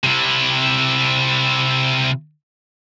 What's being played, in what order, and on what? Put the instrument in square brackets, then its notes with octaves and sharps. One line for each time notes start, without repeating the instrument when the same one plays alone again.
[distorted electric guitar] C3 E4